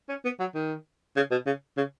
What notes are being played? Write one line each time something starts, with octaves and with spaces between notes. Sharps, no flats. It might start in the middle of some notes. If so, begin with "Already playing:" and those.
C#4
B3
F#3
D#3
C#3
B2
C#3
C#3